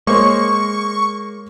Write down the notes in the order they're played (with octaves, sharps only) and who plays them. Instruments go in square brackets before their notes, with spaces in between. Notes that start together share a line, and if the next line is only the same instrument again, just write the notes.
[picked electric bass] G#3 [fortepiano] A#3 C5 C#5 [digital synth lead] C#6